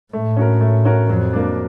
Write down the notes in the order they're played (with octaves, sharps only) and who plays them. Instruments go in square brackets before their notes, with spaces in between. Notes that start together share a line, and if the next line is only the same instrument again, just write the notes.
[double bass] A2 [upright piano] A3
[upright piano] C#4 F#4 A#4
A3
C#4 F#4 A#4
[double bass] F2 [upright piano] F#3
[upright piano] A#3 D4